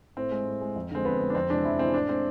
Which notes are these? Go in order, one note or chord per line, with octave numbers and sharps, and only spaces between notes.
A2 C4
G#3
A2
G#3
F2
D3 G#3 C4
F2 B3
D3 G#3
D4
F2 C4
C3 E3 G#3 D4
F2 E4
C3 E3 G#3 C4
A2 D4
G#3 C4